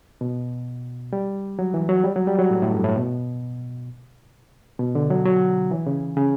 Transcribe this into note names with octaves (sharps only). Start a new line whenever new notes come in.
B2
G3
F#3
E3
F#3
G3
F#3
G3
F#3
A2
A2
G2
A2
B2
B2
D3
F#3
F#3
E3
C#3
C#3